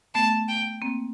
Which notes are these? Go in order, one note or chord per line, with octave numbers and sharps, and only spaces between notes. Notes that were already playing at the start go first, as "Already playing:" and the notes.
A3 B3 A5
G5
A#3 C4